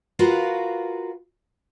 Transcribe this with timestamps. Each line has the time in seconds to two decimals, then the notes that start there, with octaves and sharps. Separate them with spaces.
0.19 F4 F#4 A#4 B4 F5